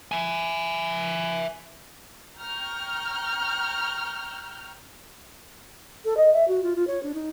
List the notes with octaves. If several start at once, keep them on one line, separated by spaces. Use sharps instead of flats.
E5 G#5
G5 A#5 C#6 F6 G6
A4
D#5
E5
F#4
F4
F4
C#5
D4
D#4